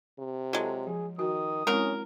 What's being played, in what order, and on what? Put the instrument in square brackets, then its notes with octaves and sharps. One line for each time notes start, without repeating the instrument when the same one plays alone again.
[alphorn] C3
[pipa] F#3 G#3 [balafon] F4 [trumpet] A4
[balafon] F3 [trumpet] G#4
[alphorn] D#3 [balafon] F#4 [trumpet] D#6
[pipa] F#3 A#4 [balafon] G#3 C4 E4 [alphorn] C#4